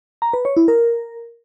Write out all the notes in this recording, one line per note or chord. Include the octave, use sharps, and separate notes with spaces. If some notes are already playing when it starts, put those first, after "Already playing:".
A#5
B4
C#5
E4
A#4